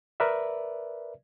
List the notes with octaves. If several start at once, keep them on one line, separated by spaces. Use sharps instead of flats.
A#4 B4 D5 E5